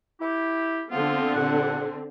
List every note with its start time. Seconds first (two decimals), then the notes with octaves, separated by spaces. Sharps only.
0.21 E4 G4
0.91 D3 F3 B3 C4 F4
1.35 C2 A#2 F#5